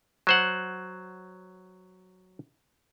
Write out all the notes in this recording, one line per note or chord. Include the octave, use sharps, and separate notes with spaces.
F#3 C5 F#5